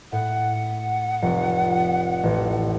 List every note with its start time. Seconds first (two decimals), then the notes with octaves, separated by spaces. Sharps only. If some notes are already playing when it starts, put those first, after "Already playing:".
0.12 A2 F#5
1.22 F1
2.23 A1